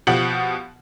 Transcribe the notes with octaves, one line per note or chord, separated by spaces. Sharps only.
B2 F3 G4 F#5 F#7